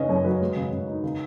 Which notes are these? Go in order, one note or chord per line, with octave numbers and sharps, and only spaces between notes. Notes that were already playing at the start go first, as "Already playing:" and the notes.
Already playing: C#3 C#4 B4 D#5
F#2 C#5
F#3 B4
G#3
C#3
C#3
D#4
C#3